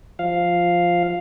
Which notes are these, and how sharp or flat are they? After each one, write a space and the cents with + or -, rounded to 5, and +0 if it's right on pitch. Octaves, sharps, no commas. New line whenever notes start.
F3 +0 F5 +0